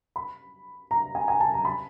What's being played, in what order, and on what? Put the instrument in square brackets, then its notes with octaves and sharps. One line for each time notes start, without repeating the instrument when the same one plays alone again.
[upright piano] B5
A#5
G#5
G#5
A5
A#5
B5